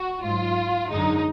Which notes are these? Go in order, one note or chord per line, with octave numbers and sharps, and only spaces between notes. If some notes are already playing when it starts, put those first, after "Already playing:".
Already playing: F#4
G#2 F#3 F4
F#2 D3 G#3 D#4